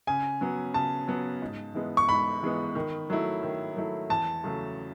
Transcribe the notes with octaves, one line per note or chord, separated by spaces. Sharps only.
C#3 G#5
F#3 B3
C#3 A5
F#3 B3
G#2
E3 G#3 B3
C#6
G#2 B5
E3 G#3 B3
D#3
F#3 A3 E4
D#3
F#3 A3 E4
E2 A5
C#3 F#3 A3